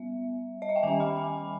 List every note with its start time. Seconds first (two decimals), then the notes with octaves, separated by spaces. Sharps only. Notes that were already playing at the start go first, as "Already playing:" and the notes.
Already playing: G3 B3 E5
0.62 D#5
0.69 E5
0.76 G5
0.83 D#3 G3 C#4 G#5
1.00 B5
1.16 G#5